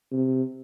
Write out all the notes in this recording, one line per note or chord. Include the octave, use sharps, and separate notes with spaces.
C3